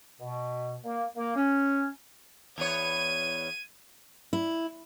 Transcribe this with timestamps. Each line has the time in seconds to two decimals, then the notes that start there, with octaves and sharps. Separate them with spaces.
0.20 B2
0.83 A#3
1.16 A#3
1.36 C#4
2.58 E2 B3 C#5 G#6 D#7
4.33 E4